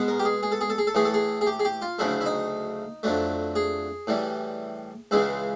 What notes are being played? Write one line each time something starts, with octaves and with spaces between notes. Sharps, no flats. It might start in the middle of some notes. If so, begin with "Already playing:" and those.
Already playing: B2 G#3 B3
A#4
G4
G#4
G#4
A4
G#4
A4
G#4
A4
A2 E3 A3 G#4
A4
G#4
G#4
G4
G#4
G4
F4
D2 C#3 F#3 A3 E4
E4
D#4
F2 D3 F#3 A3
G#4
A2 E3 G3
C#2 C#3 E3 G#3 E4